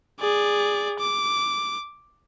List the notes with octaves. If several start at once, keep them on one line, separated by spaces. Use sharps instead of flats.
G#4 D5
D6